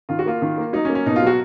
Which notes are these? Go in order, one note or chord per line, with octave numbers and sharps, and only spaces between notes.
D#3 F4
F#4
A#3 F4
D#3
A#3
F#3 D#4
C#4
A#3
C#4
B2 D#4
F4
F#3
F#4